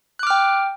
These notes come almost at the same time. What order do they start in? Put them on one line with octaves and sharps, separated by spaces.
F#6 D6 F6 G5